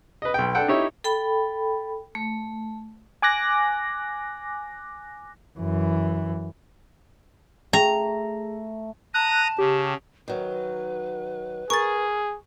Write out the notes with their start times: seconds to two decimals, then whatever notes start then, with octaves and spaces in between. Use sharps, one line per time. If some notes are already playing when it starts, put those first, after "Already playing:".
0.22 B4 D#5
0.34 B1 G5
0.55 D4 A4 F#5 G5
0.68 D#4 E4 G4 C#5 E5
1.04 A4 G5 B5
2.15 A3
3.22 G#5 D6 F#6 A#6
5.59 F#2 E3
7.73 A3 G#4 G5 A#5
9.14 A5 A#5 D#6 F#6
9.58 C#3 G4
10.28 D#3 F#3 B4
11.70 G#4 A#4 C#6 A6